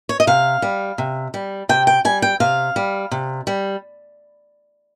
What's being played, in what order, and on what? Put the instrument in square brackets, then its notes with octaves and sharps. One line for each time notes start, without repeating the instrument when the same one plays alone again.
[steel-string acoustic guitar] C#5
D#5
C3 F5
G3
C3
G3
C3 G5
G5
G3 G#5
G5
C3 F5
G3
C3
G3